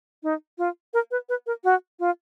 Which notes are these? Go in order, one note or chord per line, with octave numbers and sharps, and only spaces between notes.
D#4
F4
A#4
B4
B4
A#4
F#4
F4